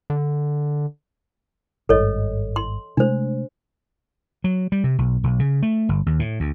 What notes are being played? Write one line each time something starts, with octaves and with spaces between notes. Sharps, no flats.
D3
G#1 G2 A4 C#5 D#5
C6
C3 G#3 A3 D4 C5
F#3
G3
C3
B1
B1
C#3
A3
G1
D#2
A2
D2